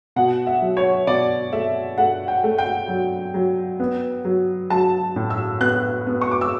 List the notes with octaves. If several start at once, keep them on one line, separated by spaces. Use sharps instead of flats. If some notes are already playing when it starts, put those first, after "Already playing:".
B2 F#5
E5
F#3
C#5
B2 D5
A3 E5
A3 F#5
G5
A3
G5
F#3
F#3
B3
F#3
F#3 A5
A2
E6
B3 F#6
B3
C#6
D6
E6